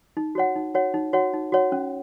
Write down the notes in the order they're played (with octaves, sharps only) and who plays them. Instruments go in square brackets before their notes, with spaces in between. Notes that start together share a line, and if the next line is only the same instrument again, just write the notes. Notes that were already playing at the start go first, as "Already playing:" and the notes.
[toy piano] D#4
F#4 C#5 F#5
D#4
F#4 C#5 F#5
D#4
F#4 C#5 F#5
D#4
F#4 C#5 F#5
C#4